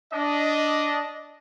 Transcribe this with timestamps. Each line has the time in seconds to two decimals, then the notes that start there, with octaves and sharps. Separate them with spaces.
0.12 D4 D#5